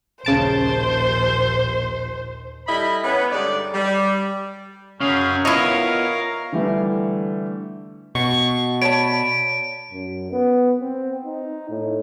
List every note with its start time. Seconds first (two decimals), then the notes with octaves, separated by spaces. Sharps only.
0.25 A#1 D#2 C#3 C5 A5 D7
2.67 G3 E4 A4 D#5 B5
3.03 B3 C#4 B4
3.32 G2 D3 G#3 D#4 D5
3.74 G3
5.00 F#2 C#4 G#4 F5
5.45 B3 E4 F4 A#4 C#5 D#5 F5
6.52 D3 E3 G3 A3
8.15 B2 C#6
8.82 C#5 D5 A5 B5 D7
9.91 F#2
10.32 B3
10.80 C4
11.26 D#4
11.70 A2